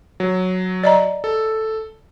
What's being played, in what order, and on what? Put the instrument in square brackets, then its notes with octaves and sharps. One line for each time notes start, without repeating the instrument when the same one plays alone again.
[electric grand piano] F#3
[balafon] D5 D#5 A#5
[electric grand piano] A4